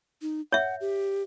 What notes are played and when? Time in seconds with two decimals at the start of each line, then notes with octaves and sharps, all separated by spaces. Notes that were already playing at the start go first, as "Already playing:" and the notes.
0.22 D#4
0.52 C#5 E5 F#5
0.81 G4